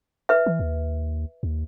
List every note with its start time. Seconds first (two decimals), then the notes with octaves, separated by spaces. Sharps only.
0.29 B4 E5
0.46 E3
0.60 D#2
1.43 D#2